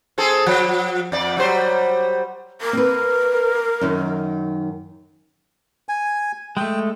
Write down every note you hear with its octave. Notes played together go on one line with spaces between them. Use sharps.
C4 G#4 A4
F3
F2 D5
F#3 G3 C5
A#4
C4 B4
F#2 D#3
G#5
G#3 A3 G5